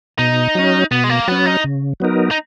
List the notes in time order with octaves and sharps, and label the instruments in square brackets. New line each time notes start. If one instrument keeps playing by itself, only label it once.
[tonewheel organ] B2 [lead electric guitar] D#4
[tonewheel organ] F#3 C#4
[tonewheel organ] B2 [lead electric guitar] B3
[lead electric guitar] G#3
A#3
[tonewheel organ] F#3 C#4 [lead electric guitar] B3
[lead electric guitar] D#4
[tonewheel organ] C#3
F#3 B3 D#4 A#4
[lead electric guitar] D#4